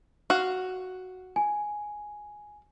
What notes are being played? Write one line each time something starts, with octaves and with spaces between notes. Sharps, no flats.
F#4 F5
G#5